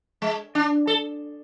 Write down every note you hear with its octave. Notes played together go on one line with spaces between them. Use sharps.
G#3
D4
A4